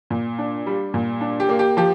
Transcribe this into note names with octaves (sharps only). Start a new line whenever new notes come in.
A#2
D4
G3
A#2
D4
G4
A#3
G4
F3 G4